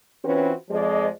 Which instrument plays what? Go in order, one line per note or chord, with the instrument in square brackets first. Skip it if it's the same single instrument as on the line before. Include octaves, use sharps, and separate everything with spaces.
[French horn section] E3 C4 C#4 F4 F#4 B4
F2 F3 G#3 C5 D5 D#5